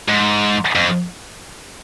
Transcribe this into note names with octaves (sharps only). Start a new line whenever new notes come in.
G#2
F2